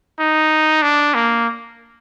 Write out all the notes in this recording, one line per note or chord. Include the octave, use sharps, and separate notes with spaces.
D#4
D4
A#3